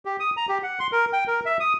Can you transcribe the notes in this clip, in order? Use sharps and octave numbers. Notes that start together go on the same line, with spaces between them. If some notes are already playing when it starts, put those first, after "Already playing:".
G4
D#6
A#5
G4
F#5
C6
A#4
G5
A#4
E5
D#6